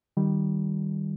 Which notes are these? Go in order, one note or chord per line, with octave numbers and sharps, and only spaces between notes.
D#3 G3